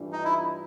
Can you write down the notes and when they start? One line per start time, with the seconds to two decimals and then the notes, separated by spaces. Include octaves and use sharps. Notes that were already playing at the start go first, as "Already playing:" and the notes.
Already playing: G2 E3 A3 D4 F4
0.12 D#4
0.25 E4